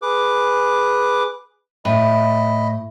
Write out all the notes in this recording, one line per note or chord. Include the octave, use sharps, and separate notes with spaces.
G#4 B4 D6
A2 D#5 B5